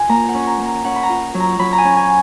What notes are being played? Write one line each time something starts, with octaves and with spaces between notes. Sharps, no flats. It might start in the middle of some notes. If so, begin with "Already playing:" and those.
Already playing: F4 G#5
A#3 A#5
F#5
C#4
A#5
A#3
A#5
C#4 F#5
B5
A#5
F4
F#3
A#5
F#3 B5
A#5
G#5
C#4
G#5